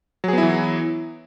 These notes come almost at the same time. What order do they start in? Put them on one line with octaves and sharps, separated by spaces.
F#3 G#4 B3 E4 E3